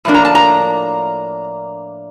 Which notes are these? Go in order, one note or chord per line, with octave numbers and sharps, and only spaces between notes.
A2 F3 A#3 D4
A#5
A5
A#5